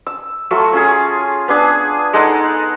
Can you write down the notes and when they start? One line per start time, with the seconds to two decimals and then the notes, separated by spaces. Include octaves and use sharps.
0.07 E6
0.51 F#3 A3 F4
0.73 C#4 F4 G#4
1.48 B3 D4 G#4
2.13 G#3 D#4 A4 F#5